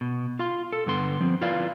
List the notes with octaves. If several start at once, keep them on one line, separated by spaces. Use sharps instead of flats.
B2
F4 F5 C6
A4
G2 D3 B3 C6
F3 C4
E4 F4 B4 D5 F5